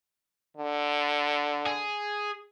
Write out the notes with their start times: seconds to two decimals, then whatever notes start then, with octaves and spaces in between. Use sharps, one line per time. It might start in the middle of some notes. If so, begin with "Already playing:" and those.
0.57 D3
1.66 G#4